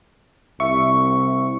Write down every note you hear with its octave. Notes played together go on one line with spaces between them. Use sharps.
C2 E5 C#6